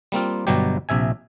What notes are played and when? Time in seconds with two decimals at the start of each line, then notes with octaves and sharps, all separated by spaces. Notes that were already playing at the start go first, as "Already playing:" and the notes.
0.12 G3 A#3 C4 F4
0.47 G1 B2 F#3 G3 G4
0.89 A#1 C3 E5 G#5